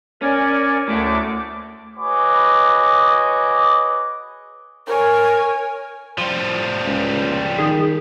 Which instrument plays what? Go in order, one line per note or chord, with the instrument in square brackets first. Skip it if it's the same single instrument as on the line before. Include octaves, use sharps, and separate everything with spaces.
[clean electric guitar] C#4 [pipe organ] A#4 D5 G#5
[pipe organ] D2 D6 [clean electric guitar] A2 A3
[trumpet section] F#4 G#4 B4 C#5 D#5 D6
[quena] A#4 [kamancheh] C#5 G#5
[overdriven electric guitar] F3 G3
[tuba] C#2
[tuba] D#3 [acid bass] G#4